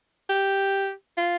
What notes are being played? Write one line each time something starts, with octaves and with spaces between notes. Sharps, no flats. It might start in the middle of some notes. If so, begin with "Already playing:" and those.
G4
F4